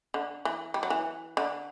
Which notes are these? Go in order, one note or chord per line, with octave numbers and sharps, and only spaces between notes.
D3
E3
G3
F#3
E3
D3